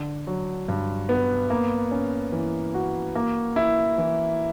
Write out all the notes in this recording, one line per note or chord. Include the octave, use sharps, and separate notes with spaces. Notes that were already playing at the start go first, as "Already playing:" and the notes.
Already playing: D3
F#3
G2
B3
A#3
C#4
E3
F#4
A#3
E4
E3